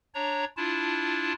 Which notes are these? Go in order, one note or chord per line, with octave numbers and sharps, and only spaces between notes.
D4 C#5 A#5
D4 E4 F4 A5